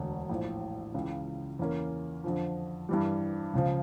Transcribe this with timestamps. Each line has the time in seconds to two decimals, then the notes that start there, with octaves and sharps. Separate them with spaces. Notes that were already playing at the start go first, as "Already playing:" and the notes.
Already playing: E1 D2 D3
0.29 A#1 A2 F3
0.94 C#2 C#3 E3
1.59 E2 E3 A#3 C#4
2.24 F2 D3 F3
2.89 G2 E3 G3
3.53 C#2 C#3 F3